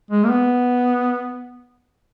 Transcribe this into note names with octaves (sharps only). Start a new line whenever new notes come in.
G#3
A#3
B3